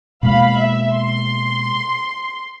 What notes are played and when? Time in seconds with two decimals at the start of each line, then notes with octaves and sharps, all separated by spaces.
0.23 B2 G#3 A#3 F5 B5
0.57 E5
0.92 C6